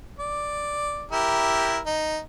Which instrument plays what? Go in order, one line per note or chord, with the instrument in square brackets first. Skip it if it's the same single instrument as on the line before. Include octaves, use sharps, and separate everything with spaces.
[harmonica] D5
E4 G4 A#4
D#4